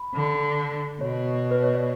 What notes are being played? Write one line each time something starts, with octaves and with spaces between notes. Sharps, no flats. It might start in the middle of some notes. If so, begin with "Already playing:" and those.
Already playing: B5
D3
B2 C#5
B4
C#5
D5